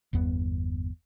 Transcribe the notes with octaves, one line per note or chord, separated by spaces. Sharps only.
G1 E2 B3